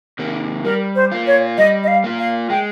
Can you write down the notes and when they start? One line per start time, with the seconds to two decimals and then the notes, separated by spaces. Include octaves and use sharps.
0.19 C3 D#3 A#3
0.65 G3 A#4
0.96 C5
1.12 A#3 F4
1.27 C#5
1.58 G3 D#5
1.84 D#5
1.88 F5
2.04 A#3 F4
2.19 F5
2.50 G#3 G5